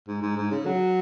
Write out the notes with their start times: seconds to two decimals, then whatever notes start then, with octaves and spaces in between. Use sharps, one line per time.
0.08 G#2
0.22 G#2
0.37 G#2
0.51 C#3
0.66 F#3